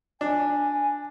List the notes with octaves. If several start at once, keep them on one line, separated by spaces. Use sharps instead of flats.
D4 G#5